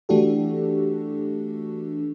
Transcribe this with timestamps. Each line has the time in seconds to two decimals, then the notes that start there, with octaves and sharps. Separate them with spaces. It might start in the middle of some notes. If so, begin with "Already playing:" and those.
0.09 E3 A3 D4 F#4 G4 A4